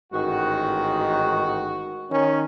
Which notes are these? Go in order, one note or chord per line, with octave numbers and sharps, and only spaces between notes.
A1 G#2 D#3 F#4
D#3 C#4